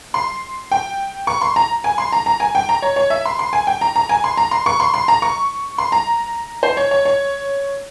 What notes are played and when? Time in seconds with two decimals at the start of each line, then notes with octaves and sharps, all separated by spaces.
0.14 C6
0.71 G5
1.27 C#6
1.41 C6
1.56 A#5
1.84 G#5
1.98 C6
2.12 A#5
2.26 A#5
2.40 G#5
2.55 G5
2.69 A#5
2.82 C#5
2.96 C#5
3.10 E5
3.25 C6
3.39 C6
3.53 G#5
3.67 G5
3.81 A#5
3.96 A#5
4.09 G#5
4.24 C6
4.37 A#5
4.51 C6
4.66 C#6
4.80 C6
4.94 C6
5.08 A#5
5.22 C#6
5.78 C6
5.92 A#5
6.63 C5
6.77 C#5
6.91 C#5
7.05 C#5